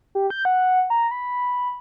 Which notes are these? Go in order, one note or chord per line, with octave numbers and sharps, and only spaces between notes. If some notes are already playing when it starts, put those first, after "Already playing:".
G4
G6
F#5
A#5
B5